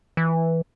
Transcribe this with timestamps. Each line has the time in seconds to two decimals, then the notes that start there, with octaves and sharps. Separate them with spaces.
0.17 E3